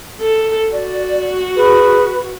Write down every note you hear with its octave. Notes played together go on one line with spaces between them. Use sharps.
A4
F#4 D5
G#4 B4